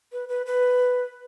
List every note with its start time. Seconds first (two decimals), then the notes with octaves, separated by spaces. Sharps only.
0.12 B4
0.29 B4
0.46 B4